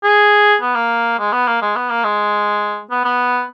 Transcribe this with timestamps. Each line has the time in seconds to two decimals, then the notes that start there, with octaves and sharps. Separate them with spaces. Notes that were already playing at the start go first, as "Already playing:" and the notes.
0.04 G#4
0.62 B3
0.75 A#3
1.19 G#3
1.32 B3
1.48 A#3
1.62 G#3
1.76 B3
1.90 A#3
2.04 G#3
2.91 B3
3.05 B3